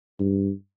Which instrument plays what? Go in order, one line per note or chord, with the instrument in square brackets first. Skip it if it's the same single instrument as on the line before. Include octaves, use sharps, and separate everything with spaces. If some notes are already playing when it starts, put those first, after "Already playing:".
[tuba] G2